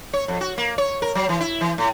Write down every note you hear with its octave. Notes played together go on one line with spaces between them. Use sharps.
C#5
F2
F#4
A#3
C#5
A#4
F#3
E3
E4
E3
A2